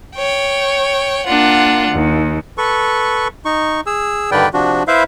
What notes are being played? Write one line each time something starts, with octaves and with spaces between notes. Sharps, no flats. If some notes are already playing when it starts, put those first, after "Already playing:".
C#5 G5
A#3 D4 F4 F#5
D#2
A4 B4 C#6
D#4 C#6
G#4 E6
G2 D3 D#3 B4 D5 G5
C3 F3 D4 F#4
E4 B4 C5 E5 F5